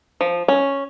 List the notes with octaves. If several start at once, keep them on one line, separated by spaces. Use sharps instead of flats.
F3
C#4